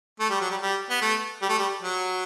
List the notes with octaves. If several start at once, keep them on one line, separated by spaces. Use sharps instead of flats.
A3
G3
F#3
G3
G3
B3
A3
G3
A3
G3
F#3